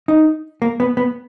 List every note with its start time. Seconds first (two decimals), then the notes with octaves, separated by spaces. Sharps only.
0.08 D#4
0.62 A#3
0.80 B3
0.97 B3